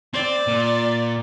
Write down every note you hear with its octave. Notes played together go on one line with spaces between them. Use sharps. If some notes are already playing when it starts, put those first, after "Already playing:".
C4 D5
A#2